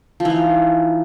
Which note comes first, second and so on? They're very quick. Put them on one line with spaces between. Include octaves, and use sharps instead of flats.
F3 E3 D#4